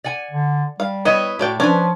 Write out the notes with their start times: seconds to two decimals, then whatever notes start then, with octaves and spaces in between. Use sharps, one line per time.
0.04 D5 F#5 G#5
0.31 D3
0.80 G3 F5
1.05 B3 E4 C#5 D#5
1.39 A2 A3 F#4 D5 G5
1.60 F3 C#4 D4 B4